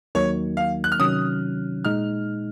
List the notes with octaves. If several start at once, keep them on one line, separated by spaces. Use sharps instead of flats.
D#2 D#3 F#3 A#3 D#4 C#5
F5
F#6
F6
C3 D#3 F#3 C#4 D#6
A#2 G#3 D#4 F6